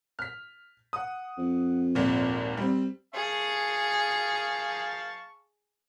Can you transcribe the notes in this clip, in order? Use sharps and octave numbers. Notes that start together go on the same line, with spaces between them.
F6 B6
F#5 D#6
F2
G#1 D#2 A#2
G3 C4
G#4 F5 A5 C#6